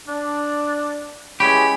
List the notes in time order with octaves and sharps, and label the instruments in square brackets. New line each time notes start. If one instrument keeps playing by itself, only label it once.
[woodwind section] D4
[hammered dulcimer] C#3 G#3 [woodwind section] E3 G#4 C#5 [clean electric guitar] G4 [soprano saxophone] B5